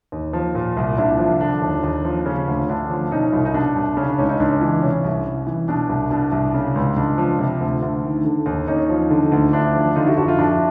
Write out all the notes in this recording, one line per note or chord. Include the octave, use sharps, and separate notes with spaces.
D#2
F3
A#2
C2
C2 D4 E4
F3
D3 D4
D#2
D#2
F3
C#3 C#4
D2
D2 D4
F3
B2 C#4 D#4
C2
D#4
B2 D4
C2
C#3 C#4
D4
C#2 C#4 D#4
C#4 D#4
C#2 D4
E3
C3 C#4
C2
C2
E3
B2 D4
C2
B2 D4
C2
C#3
C#2
C#2 D4
F3
C3
D2
D2
D#3
D3
D#2
D#2 C#4 D#4
F3
D3
D2
D2 D4 E4
F3
D3 D#4 F4
E4 F#4
F2 E4 F#4
D#4 F4
F2 D4 E4